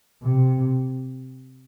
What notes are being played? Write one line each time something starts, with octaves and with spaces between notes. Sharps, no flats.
C3